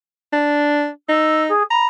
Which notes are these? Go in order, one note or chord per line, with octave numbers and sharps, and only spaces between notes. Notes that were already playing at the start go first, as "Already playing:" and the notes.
D4
D#4 E6
G#4
A#5 B5